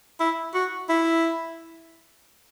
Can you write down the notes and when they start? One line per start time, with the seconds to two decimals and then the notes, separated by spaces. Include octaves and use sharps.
0.20 E4
0.54 F#4
0.89 E4